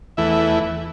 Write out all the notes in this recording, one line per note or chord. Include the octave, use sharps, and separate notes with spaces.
E2 E3 A3 E4 E5
E5